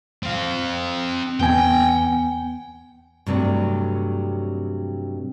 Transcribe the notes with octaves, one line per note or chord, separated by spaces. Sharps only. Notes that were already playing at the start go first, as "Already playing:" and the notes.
C4 F5
E2 B3 G5 G#5
G2 C3 F#3 A3